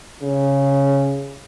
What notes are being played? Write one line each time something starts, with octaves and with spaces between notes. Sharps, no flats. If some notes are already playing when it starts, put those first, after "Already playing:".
C#3